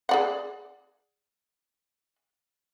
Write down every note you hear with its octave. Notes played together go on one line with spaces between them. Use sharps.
G#4 D5 F#5